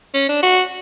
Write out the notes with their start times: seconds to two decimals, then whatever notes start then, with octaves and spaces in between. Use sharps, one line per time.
0.14 C#4
0.29 D4
0.43 F#4